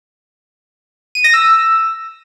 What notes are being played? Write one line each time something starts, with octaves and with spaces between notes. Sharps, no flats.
D#7
A#6
E6